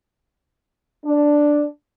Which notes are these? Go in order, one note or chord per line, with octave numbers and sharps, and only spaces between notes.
D4